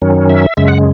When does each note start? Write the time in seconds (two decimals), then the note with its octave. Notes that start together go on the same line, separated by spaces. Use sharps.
0.02 F#2 D#3 F#3 C#4
0.30 E5
0.57 F#2 C#3 G#3 E5
0.68 F#5